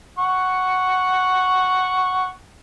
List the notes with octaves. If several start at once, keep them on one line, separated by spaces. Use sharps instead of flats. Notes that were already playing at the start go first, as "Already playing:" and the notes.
F#5 C#6